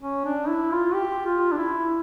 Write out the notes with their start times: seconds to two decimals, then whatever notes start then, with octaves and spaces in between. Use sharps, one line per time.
0.01 C#4
0.25 D4
0.48 E4
0.72 F4
0.94 G4
1.26 F4
1.52 D4
1.58 E4